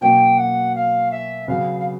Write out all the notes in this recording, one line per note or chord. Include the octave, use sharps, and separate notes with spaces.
B2 F#3 A#3 C#4 G5
F#5
F5
E5
C#3 F#3 B3 F5
F5